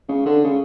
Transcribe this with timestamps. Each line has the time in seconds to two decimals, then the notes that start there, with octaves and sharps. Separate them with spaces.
0.08 C#3
0.26 D3
0.44 C#3